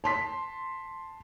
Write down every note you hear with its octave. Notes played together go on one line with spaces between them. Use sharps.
A5 C6 B6